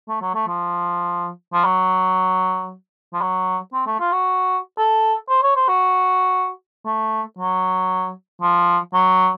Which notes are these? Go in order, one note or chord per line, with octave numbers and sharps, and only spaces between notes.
A3
F#3
A3
F3
F3
F#3
F3
F#3
C4
A3
F4
F#4
A4
C5
C#5
C5
F#4
A3
F#3
F3
F#3